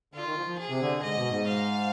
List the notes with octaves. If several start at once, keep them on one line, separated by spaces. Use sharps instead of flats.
D3 F4
D#3
F3
F3
G#4
C3
D3
G#2 D#5
B2
G#2
F5